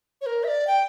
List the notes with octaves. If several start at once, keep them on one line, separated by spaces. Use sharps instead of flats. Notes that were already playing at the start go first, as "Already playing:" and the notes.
C#5
A#4
E5
D5
G5